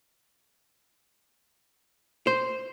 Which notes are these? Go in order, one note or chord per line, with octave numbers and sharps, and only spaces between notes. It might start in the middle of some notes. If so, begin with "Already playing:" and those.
C5